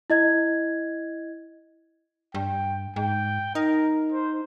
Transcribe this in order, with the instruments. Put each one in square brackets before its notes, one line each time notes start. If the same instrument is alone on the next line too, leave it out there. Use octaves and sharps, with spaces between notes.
[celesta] E4 D#5 G#6
[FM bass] G2 [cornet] G5
[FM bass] G#2 [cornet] G5
[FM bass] D#4 [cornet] A#4
[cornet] C5